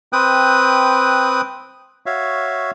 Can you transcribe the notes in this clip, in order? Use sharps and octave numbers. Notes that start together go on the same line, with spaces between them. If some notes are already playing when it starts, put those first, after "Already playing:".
C4 B4 G5 D#6 F#6
F#4 C#5 E5 F5